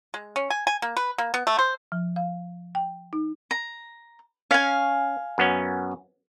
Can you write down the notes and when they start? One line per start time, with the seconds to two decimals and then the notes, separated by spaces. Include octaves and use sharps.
0.14 G#3
0.36 C#4
0.50 G#5
0.67 G#5
0.82 A#3
0.97 B4
1.18 A#3
1.34 B3
1.47 A3
1.59 C5
1.92 F3
2.16 F5
2.75 G5
3.13 D#4
3.51 A#5
4.51 C#4 F5 G#5
5.38 F#2 B3 C#4